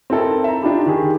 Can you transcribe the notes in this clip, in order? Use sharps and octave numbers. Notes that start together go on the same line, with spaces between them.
C4 D#4 E4 A4 A#4
E5 A#5
D4 D#4 F4 G4 B5
D#3 D#4 G4 G#4 A#4